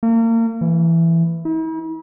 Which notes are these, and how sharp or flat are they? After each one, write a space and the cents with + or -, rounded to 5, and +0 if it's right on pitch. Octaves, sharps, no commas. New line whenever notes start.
A#3 -35
E3 +10
E4 -45